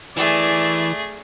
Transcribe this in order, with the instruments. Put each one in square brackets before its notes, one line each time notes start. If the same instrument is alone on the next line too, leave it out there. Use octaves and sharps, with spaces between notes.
[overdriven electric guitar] E3 [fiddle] A3 G#4 [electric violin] D5